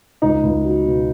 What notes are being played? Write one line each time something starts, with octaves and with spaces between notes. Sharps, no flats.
C#2 D#4
C#2
F#3
B2